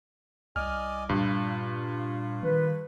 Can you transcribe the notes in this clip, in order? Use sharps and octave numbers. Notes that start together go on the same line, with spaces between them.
C2 D5 D#5 G#5 F6
G2 A#2 F4
D#3 B4